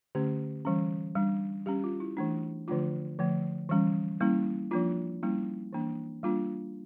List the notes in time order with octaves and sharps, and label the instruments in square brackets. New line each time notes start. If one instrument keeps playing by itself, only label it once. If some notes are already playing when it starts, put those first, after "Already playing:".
[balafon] D3 A3 C#4 G4
E3 G3 C#4
G3 D4
G3 C#4 G4
F4
E4
E3 A3 D4
D3 F3 A3 D4 F4
D3 F3 A3
E3 G3 C#4
G3 A#3 C#4 E4
F3 A#3 D4 F4
G3 A#3 C#4 E4
E3 A#3 D4
G3 A#3 D4 F4